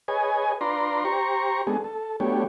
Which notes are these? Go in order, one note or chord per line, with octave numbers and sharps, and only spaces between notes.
G#4 B4 C#5 D#5 G#5
D4 F4 B4 D5 A#5 C6
G4 C5 A#5 C#6
G#3 B3 D4 G#4 A4
A4
F#3 A3 B3 D4 G4 C#5